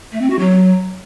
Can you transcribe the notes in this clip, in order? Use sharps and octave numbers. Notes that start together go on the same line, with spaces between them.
A3
C4
F#4
F#3